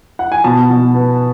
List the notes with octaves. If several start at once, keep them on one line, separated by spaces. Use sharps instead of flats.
F#5
G#5
B2 A5
B2
B3